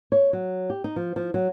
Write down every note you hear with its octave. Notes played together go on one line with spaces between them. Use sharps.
C#5
F#3
G4
D#4
F3
F3
F#3